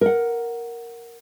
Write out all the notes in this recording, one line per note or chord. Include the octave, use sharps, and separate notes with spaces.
A#4 F#5